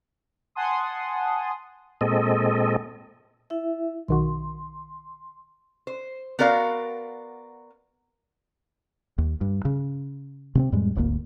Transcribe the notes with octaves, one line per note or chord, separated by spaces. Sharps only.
F#5 G#5 A5 C6 D#6
A#2 G#3 C4 A4 D#5
E4 E5
B1 D#3 F#4 C6
C5
B3 F#4 A#4 D5 F5
D#2
G2
C#3
C3 B3 C4
F2 A2 G3 G#3
D1 G#1 D2 A#3